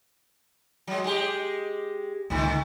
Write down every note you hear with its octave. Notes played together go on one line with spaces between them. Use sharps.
F#3 G#3
G#3 G4
C#2 A2 D3 D#3 A3